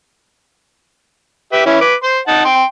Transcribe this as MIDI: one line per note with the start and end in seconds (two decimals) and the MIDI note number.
1.53 1.65 67
1.53 1.65 71
1.53 1.65 76
1.66 1.81 52
1.66 1.81 61
1.66 1.81 64
1.81 1.95 71
1.81 1.95 86
2.03 2.19 72
2.03 2.19 84
2.28 2.44 63
2.28 2.44 78
2.28 2.44 81
2.45 2.64 79
2.45 2.64 84